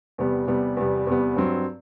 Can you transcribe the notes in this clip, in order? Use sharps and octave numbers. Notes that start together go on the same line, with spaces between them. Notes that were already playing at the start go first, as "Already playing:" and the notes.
E2 C3 G3 B3
E2 C3 G3 B3
E2 C3 G3 B3
E2 C3 G3 B3
G2 F#3 C4